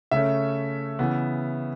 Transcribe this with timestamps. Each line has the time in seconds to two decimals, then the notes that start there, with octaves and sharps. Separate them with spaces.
0.11 C#3 A3 C#4 E5
0.99 C#3 E3 B3